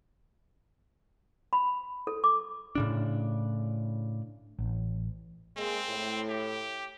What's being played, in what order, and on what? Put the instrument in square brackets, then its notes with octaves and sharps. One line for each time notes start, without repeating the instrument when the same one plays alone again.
[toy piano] B5
A4
D6
[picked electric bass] A2 C#3 D4
[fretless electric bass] A1
[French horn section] G#3 A#3 [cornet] C4
[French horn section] A2
[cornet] G4